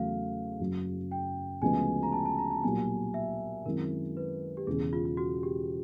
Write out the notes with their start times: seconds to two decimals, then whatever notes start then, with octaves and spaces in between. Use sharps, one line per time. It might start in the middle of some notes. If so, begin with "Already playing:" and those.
Already playing: E2 C#3 F#3 A3 F5
0.60 F#1 F#2 C#3 F#3
1.11 G5
1.62 D2 C#3 F3 G#3 B3 G#5
2.03 A#5
2.12 A5
2.26 A5
2.38 A#5
2.51 A5
2.63 B1 A#2 G3 G#5
3.14 E5
3.65 F#2 D#3 G#3 C4 E4 A#4
4.17 B4
4.57 G4
4.67 E1 E2 C#3 G#4
4.93 F4
5.05 F4
5.17 F#4
5.43 G4